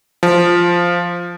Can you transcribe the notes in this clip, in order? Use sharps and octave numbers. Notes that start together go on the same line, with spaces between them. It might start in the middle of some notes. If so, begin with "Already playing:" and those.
F3